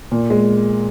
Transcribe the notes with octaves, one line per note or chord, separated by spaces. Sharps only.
A#2
G#3